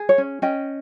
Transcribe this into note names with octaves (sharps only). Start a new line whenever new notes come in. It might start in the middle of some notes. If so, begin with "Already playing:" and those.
Already playing: G#4
C#5
C#4
C#4 D#5 G5